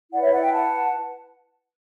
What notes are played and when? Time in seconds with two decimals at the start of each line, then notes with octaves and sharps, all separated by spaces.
0.12 E4 B4 D5 F#5
0.22 C#5 E5
0.32 D5 F#5
0.42 E5 G5
0.53 F#5 A5